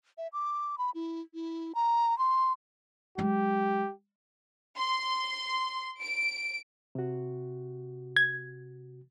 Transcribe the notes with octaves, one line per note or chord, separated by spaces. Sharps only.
E5
D6
B5
E4
E4
A#5
C6
F#3 G#3 G4
C6
D7
C3 F#4
G#6